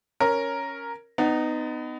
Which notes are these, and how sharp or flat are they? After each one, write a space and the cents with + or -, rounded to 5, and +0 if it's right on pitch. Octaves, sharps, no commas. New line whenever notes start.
C#4 +0 A#4 +0
B3 +25 D#4 -15